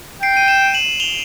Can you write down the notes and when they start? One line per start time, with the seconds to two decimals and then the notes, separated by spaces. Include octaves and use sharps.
0.22 G5 C7 D7
0.37 D#7
0.48 D7 E7
0.74 E7 F#7
1.00 F7 G7